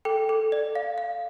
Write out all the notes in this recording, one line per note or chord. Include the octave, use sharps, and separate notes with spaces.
A4 G5
A4
D5
F5
F5